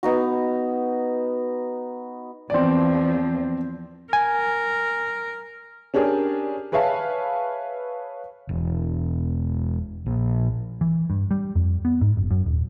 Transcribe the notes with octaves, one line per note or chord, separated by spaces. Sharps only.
B3 D#4 F#4
E2 F3 C4 D5
A#4 G#5
C#4 D4 G4 G#4 A#4
G#4 B4 C#5 E5 F5 A5
E1
A#1
E3
G2
G3
F2
B3
G#2
F#1
F#2
D#1